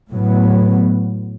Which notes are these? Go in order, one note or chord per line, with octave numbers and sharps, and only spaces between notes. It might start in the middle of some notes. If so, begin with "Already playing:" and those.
A2 F#3 B3